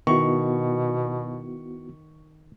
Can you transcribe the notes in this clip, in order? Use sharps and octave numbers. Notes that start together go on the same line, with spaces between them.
B2 D#3 B3 E4 F#4 C#6